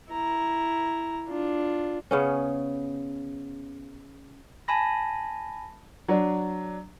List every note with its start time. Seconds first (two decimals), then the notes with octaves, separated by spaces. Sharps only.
0.11 E4 A#5
1.29 D4 F4
2.11 C#3 B3 C#4
4.68 G#5 A5 B5 A#6
6.08 F#3 D4